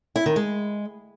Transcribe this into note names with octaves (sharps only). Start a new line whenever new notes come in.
E4
D#3
G#3